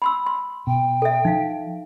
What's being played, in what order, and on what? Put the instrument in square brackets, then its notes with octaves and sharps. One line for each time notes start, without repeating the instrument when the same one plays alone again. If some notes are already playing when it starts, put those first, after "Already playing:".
[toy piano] B5 C6 E6
C6
[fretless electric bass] B2 [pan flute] G5
[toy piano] A4 E5
[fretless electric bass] F3 [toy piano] D#4 F5